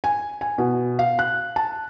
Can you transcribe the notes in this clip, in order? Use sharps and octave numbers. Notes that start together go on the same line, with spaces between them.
G#5
G#5
B2
F5
F#6
A5